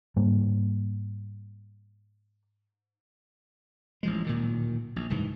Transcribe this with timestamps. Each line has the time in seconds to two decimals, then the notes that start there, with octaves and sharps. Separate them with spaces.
0.16 G#2 G3 A#3
4.03 A1 F3 G#3
4.27 D1 A#2 D#3
4.96 A#1
5.10 F#1 C2 G#2 E3